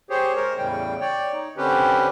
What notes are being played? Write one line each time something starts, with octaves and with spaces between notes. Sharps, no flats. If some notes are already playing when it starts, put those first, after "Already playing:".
G4 G#4 C5 C#5
G#3 A#4 C5 C#5
E2 A2 C#3 G3 G5
C#5 D5 G5
D#4
D3 C4 C#4 G4 B4